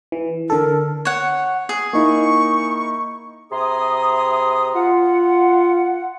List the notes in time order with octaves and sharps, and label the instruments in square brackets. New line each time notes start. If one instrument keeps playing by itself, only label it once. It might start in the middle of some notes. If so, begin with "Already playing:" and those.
[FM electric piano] E3
[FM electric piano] D3 A4 [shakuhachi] A#4
[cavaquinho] C#5 F#5
G#4
[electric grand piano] A#3 D#4 E4 [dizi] C#6
[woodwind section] C3 E4 G#4 A#5 C6 D#6
F4 F#5